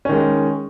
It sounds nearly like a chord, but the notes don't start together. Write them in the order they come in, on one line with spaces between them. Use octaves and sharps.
C#4 D#3 G#3